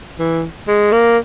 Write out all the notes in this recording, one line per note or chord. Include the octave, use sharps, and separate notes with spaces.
E3
G#3
A#3